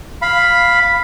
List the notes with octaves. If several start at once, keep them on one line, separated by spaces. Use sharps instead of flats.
F5 B5